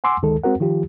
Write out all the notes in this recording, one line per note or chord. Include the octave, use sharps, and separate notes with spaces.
F#5 G#5 C6 D6 E6
D2 D#3 G#3 A4
G#3 C4 F#4 A#4 F#5
D#3 F3 F4 G4